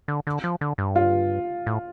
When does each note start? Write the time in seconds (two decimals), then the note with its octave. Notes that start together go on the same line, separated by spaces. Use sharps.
0.08 D3
0.27 D3
0.44 F3
0.61 D3
0.78 G2
0.96 F4
1.66 A2